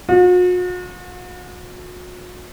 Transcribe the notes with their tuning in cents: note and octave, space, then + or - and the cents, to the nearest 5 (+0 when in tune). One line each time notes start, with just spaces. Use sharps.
F#4 -45